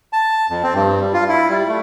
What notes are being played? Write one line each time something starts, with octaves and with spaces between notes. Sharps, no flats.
A5
F2
C4
G2
G3
F4
E4
G3
A3